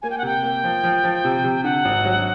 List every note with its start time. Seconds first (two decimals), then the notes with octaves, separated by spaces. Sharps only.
0.02 A#3 G#5
0.10 G5
0.18 F#5
0.23 C3 G5
0.43 A#3
0.64 F3
0.84 F3
1.04 F3
1.24 C3
1.44 C3
1.64 D3 F#5
1.85 G#1
2.05 F#3